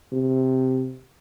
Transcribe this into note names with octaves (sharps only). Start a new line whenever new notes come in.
C3